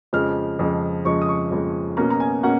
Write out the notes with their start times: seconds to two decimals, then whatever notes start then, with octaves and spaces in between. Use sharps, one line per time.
0.13 F2 C#3 F3 G#3 F6
0.59 F2 C#3 F3 G#3
1.05 F2 C#3 F3 G#3 C#6
1.22 D#6
1.29 C#6
1.51 F2 C#3 F3 G#3
1.97 B2 A#3 C#4 A#5
2.10 A#5
2.20 G#5
2.43 B2 A#3 C#4 F#5